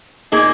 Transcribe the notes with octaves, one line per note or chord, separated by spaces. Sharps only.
A#2 A#3 D#4 G#4